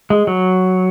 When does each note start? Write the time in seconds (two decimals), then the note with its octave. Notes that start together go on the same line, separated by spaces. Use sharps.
0.10 G#3
0.27 F#3